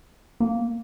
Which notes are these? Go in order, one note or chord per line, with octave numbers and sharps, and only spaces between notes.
A#3